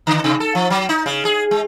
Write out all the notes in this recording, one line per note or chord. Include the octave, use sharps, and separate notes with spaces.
D3
C3
A4
F3
F#3
D#4
C#3
G#4
G#3